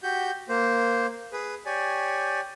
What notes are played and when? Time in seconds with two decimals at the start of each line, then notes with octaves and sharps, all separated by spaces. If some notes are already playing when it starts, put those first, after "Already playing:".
0.03 F#4 G4 G6
0.49 A#3 C5
1.33 G#4 B4
1.66 G4 C#5 D5 G#5